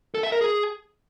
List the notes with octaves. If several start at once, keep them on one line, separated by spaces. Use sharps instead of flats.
A4
E5
A#4
G#4